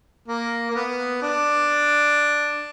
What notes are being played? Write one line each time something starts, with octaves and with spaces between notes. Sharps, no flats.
A#3
A#3
B3
D4